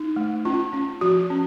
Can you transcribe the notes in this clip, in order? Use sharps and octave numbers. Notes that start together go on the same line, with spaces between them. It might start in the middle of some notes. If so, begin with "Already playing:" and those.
Already playing: D#4
A3
C#4 F4
C#4
F3 F#4
C#4